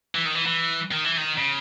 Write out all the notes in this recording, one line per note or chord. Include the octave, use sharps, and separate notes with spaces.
E3
D#3
E3
E3
D#3
E3
D#3
C#3